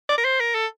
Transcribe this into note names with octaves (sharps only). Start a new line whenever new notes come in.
D5
A#4
C5
A#4
A4